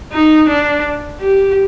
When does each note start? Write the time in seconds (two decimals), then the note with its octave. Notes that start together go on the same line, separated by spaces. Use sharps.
0.13 D#4
0.49 D4
1.21 G4